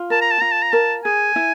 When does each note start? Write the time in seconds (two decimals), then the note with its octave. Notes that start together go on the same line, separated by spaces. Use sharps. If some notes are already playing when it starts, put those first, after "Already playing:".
Already playing: F4
0.10 A#4 A5
0.21 A#5
0.31 A5
0.41 F4 A#5
0.52 A5
0.62 A#5
0.73 A#4 A5
1.05 G#4 G#5
1.36 E4